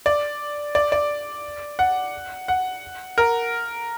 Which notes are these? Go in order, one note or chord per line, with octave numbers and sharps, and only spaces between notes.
D5
D5
D5
F#5
F#5
A#4